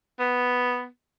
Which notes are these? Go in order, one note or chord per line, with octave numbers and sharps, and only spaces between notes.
B3